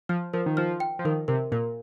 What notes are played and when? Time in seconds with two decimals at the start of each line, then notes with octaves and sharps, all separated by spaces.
0.09 F3 F6
0.33 F3 A#4
0.46 D#3
0.57 F3 F6
0.80 G5
0.99 F3
1.05 D#3 A#4
1.28 C3 A#4
1.52 A#2 A#4